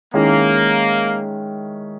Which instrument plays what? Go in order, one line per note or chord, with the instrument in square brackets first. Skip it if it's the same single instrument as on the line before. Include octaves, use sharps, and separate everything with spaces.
[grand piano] D#3 G#3 C#4 E4 [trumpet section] A#3